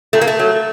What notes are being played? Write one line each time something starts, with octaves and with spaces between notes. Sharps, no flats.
A#2 A3
A#3
A3
F#3